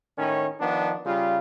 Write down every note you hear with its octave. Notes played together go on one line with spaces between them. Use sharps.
A2 D#3 C#4
D#3 F3 B3 D4
C#3 G3 F4